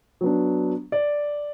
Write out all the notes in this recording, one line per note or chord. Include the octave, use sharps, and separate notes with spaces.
F#3 B3 D4
D5